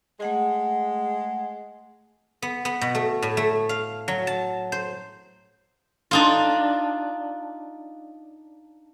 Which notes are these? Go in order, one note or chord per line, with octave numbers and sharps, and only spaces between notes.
G#3 A3 F#5 G#5
B3
B3
B2
A3
A2
A3
F5
F#3
A5
C5
D4 D#4 F4